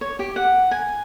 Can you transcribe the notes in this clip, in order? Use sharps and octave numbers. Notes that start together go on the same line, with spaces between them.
C#5
G4
F#5
G#5